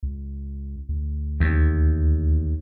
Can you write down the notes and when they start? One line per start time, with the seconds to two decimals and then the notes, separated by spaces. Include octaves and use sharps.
0.03 C#2
0.89 D2
1.40 D#2